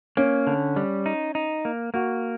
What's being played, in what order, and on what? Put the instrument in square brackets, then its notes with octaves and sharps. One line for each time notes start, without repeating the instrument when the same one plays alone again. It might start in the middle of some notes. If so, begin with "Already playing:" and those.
[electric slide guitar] A#3 [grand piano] C#4
[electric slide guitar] D3
G3
D#4
D#4
A#3
[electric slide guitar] A#3 [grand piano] F#4